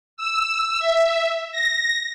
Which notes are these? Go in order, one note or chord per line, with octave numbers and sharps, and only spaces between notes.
E6
E5
A#6